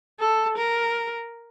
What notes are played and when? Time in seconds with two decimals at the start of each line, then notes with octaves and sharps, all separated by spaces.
0.20 A4
0.57 A#4